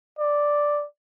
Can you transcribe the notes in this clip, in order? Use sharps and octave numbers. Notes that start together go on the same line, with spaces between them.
D5